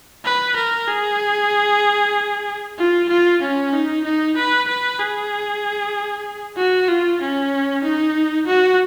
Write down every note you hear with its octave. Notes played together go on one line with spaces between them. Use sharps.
B4
A#4
G#4
F4
F4
C#4
D#4
D#4
B4
B4
G#4
F#4
F4
C#4
D#4
F#4